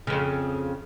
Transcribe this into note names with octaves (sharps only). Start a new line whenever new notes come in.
F2 C#3